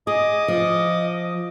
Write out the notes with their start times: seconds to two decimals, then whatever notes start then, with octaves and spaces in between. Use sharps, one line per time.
0.07 G#4 D#5 D6 D#6
0.48 F3